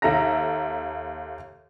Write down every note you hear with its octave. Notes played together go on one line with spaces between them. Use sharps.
D#2 A4 E5 A#5 A#6